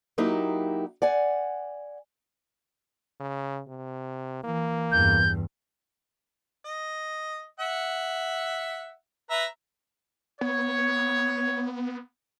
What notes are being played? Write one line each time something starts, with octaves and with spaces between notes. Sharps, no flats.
F#3 A#3 D#4 E4 G4
D5 F#5 G#5
C#3
C3
E3 A#3
E2 G2 G6
D#5
E5 F#5
B4 E5 A#5
B3 C#5